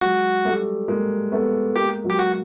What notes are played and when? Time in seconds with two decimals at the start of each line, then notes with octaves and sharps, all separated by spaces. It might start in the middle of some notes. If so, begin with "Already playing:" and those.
0.01 F#3 G#3 F#4
0.45 G3 A3
0.88 G#3 A#3
1.32 A3 B3
1.75 G#3 A#3 G4
2.04 F#3 G#3
2.10 G4
2.19 F#4